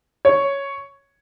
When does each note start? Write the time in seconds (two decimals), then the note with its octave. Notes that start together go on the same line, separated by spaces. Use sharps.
0.25 C#5